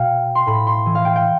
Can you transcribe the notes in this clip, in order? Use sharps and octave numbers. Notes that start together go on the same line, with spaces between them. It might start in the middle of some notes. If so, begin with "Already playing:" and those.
Already playing: B2 F5 G5
C6
A2 B5
C6
E3
F5
G5
G5